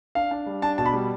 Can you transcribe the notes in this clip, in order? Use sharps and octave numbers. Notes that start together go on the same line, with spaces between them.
D4 F5
D4
G3
D4 A5
B2 A5
B5
G3